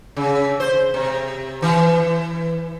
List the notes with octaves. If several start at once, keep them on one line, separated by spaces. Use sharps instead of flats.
C#3
C5
C3
E3